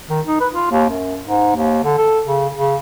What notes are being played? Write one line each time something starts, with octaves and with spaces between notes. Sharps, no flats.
D#3
D#4
B4
F4
D#2
F#2
G#2
D#2
D3
A4
C#3
C#3